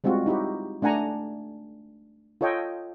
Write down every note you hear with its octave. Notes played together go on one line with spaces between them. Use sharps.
G3 G#3 C4 F4 F#4
D#4 E4 F#4 G4
A3 D4 F#5 G#5 A#5
F4 A4 C#5 D#5 G5